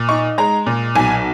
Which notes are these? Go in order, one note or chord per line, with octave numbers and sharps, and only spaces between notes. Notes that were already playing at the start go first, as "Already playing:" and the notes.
Already playing: A#2
D#4 C#6
G#3 A#5
A#2
B1 G#5